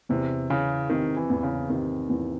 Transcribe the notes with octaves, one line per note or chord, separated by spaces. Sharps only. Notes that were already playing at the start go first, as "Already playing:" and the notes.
E2 C3
C#3 E3
C3 D#3
E3
E2
C#3
C3 D#3
E2